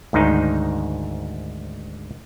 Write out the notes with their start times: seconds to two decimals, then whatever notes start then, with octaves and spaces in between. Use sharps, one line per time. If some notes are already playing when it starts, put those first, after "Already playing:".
0.13 D2 G#2 D#3 D#4